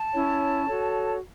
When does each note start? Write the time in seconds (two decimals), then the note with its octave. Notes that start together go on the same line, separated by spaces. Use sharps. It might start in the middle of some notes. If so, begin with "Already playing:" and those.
Already playing: A5
0.13 C#4 E4 C#5
0.66 F#4 A4 C#5